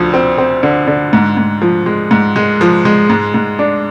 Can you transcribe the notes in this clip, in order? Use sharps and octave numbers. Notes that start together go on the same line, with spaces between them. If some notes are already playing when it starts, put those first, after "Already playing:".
Already playing: D2 D3 F3
C4
C4
D3
D3
G#2
G#2
F3
G#3
G#2
G#3
F3
G#3
G#2
G#2
D4